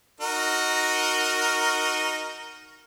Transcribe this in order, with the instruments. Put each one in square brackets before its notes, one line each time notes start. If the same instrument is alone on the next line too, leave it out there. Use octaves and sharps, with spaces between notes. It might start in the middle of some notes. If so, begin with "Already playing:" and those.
[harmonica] D#4 F#4 A#4